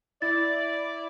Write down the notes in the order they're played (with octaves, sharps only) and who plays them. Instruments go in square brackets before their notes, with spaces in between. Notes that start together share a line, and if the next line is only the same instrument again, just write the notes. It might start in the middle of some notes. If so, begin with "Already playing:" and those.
[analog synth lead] E4 [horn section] D5 [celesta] A6